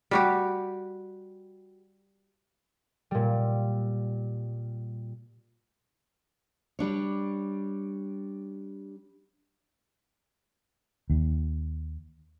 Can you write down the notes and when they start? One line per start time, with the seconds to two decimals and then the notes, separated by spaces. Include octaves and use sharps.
0.11 G3 F#4 G4
3.11 A#2 G3
6.79 G3 D4 C#5
11.10 D#2